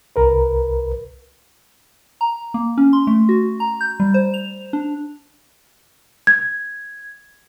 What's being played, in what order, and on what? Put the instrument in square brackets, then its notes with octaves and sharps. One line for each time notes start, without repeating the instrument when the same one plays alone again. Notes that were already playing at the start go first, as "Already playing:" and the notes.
[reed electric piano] C2 A#4 B4
[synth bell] A#5
A#3
C#4
C6
A3
F#4
A#5
G6
G3
C5
F7
D4
[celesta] G#6